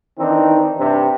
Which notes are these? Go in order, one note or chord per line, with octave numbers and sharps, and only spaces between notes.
D#3 E3 C4 D4 D#4
G2 C3